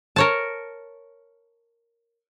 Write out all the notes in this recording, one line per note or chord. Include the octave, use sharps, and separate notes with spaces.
A#4 C#5 A5